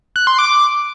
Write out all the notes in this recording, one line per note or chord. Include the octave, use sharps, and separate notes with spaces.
F#6
C6
D6